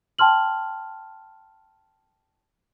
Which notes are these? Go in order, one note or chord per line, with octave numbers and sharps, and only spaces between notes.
G5 A5 C6 F6 F#7